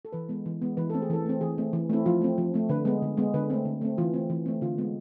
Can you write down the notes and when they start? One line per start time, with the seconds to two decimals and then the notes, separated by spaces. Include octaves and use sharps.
0.05 A4
0.13 E3 B4
0.29 G#3 B3
0.46 E3
0.62 G#3 B3
0.77 E3 B4
0.90 A3 C4 A4
1.02 G#4
1.10 E3 A4
1.26 A3 C4
1.41 E3 G#4
1.58 A3 C4
1.73 E3
1.90 A3 C4 E4
2.06 F3 F4
2.21 A3 C4
2.38 F3
2.54 A3 C4
2.69 D3 B4
2.85 G#3 B3
3.02 D3
3.17 G#3 B3
3.34 D3 B4
3.50 A3 C4
3.65 D3
3.81 A3 C4
3.98 E3 F4
4.14 A3 C4
4.30 E3
4.46 A3 C4
4.62 D3 F4
4.78 G#3 B3